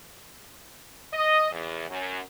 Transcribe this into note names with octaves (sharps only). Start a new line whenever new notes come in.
D#5
E2
F#2